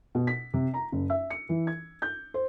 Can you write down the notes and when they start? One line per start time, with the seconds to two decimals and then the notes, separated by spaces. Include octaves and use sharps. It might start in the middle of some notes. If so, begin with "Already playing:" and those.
0.15 B2
0.27 B6
0.54 C3
0.74 A#5
0.92 F#1
1.10 E5
1.30 C#7
1.49 E3
1.67 G#6
2.02 G6
2.34 C5